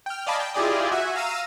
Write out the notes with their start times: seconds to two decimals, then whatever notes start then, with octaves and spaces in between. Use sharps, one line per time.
0.06 G5 F6
0.26 D5 D#5 F5 G#5 A5 B5
0.40 G5
0.54 E4 F4 G4 G#4 D5 D#5
0.92 F#4 E5 G#5
1.16 F5 A#5 E6 D#7